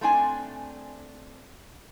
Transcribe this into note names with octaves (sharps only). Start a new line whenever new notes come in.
A3 C4 D4 G#5